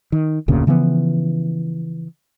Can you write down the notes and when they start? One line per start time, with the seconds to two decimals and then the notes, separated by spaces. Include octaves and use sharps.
0.12 D#3
0.48 F1 D2 A#2 C#3
0.67 C#3 E3 F3 B3